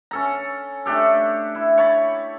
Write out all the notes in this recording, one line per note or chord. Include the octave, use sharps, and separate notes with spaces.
C#4 A4 A#5
A3 D4 G4 A4
E4
C#5 A5 B5